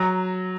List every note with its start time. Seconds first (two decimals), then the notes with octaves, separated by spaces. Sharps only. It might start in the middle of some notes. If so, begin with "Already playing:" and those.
Already playing: F#3 A#5